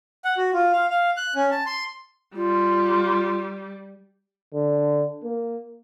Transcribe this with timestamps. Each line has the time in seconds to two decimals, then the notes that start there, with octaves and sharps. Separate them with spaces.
0.25 F#5
0.37 F#4
0.53 F4
0.72 F5
0.90 F5
1.17 F#6
1.36 C#4
1.51 A5
1.66 C6
2.35 G3 F4
4.54 D3
5.24 A#3